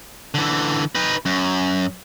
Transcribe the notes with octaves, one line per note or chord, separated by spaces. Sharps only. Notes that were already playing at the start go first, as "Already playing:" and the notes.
D3 E3
D#4 B4
F#2